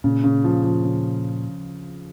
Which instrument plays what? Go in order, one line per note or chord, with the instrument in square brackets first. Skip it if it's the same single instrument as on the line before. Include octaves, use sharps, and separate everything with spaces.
[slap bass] A#2 [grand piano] C#3
[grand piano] C#3
F3
F3
C#3